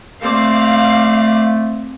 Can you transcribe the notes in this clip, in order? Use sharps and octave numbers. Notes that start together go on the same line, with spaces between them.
A3 C4 D5 F5